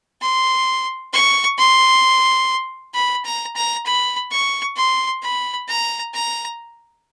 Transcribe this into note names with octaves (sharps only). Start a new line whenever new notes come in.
C6
C#6
C6
B5
A#5
A#5
B5
C#6
C6
B5
A#5
A#5